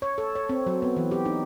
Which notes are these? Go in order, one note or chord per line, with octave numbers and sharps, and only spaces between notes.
C#5
A4
C#5
C4
F#3
B3
E3
G4
D#4